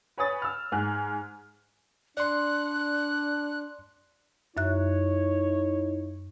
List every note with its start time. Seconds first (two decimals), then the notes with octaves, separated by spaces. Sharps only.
0.18 B4 C#5 G#5 B5 D#6 A6
0.42 E6 F6
0.72 G#2 G#5 F6 F#6
2.17 D4 D5 C6 F#6
4.57 F#2 D#4 E4 C#5 E5 F#6